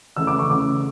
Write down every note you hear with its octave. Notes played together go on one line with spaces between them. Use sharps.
C#3 E3 A3 E6
D6
C#6
C#3 E3 A3 D6